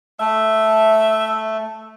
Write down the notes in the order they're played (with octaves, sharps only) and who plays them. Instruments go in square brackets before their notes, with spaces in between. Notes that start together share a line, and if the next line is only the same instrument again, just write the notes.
[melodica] A3 [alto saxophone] E5